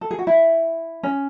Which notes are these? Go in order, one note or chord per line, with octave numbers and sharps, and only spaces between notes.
A4
G#4
F#4
E4
C#4